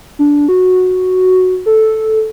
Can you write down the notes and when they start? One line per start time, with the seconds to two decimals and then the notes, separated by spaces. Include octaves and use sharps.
0.19 D4
0.48 F#4
1.66 A4